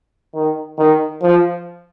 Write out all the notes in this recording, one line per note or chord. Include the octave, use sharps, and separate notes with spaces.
D#3
D#3
F3